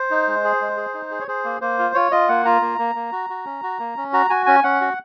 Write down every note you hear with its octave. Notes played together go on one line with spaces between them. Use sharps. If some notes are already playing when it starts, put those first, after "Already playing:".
Already playing: C5
D#4
G#3
G#4
G#3
G#4
D#4
G#4
C#5
G#4 C5
A#3
A#3 C5
F4
F4 C#5
F4 D#5
A#3 F#5
F4 A#5
A#3
A#3
A#3
F#4
F#4
C#4
F#4
A#3
C#4
F#4 A#5
F#4 G#5
C#4 G#5
C#4 F#5
F#4